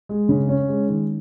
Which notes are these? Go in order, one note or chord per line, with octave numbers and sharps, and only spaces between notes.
G#3
C#3
C#4
G#3
D#3